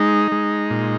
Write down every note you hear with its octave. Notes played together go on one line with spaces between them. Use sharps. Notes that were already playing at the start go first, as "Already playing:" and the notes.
Already playing: G#3 D#4
G#3
A#2